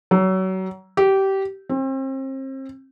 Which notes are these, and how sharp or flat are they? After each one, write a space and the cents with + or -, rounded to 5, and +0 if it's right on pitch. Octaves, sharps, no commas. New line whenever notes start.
F#3 +30
G4 -20
C4 +35